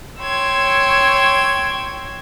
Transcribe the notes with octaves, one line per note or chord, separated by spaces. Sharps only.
C#5 G5 C6 E6 G#6